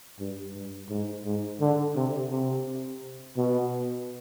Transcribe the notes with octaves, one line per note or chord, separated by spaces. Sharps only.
G2
G2
G#2
G#2
D3
C3
C3
B2